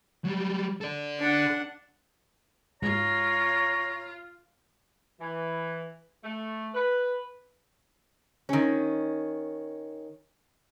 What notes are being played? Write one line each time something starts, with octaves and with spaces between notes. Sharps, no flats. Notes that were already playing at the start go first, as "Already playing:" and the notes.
F#3 G3
A4 D5
D4 F#5
G#2 F4 C#5 A#5
E3
A3
B4
D#3 C#4